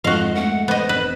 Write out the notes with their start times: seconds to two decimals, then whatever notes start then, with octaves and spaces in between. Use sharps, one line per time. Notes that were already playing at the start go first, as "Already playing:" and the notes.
0.04 F2 G#2 F3 F#4 D#5 F5
0.35 G#3 A3 F#5
0.68 B3 C5 D#5
0.89 F1 B4